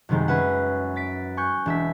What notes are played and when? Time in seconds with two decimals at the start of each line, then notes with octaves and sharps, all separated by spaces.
0.09 F#2 C3 D#3 G3 G#3
0.28 C#4 G#4 B4 E5 F#5
0.96 A6 B6 D7
1.37 G#5 C#6 F#6 G6
1.66 E1 E5 B6